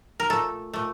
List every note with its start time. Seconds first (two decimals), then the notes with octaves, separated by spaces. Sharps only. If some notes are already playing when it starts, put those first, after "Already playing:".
0.20 A#4
0.30 A#2 A3 A4
0.73 A#2 A3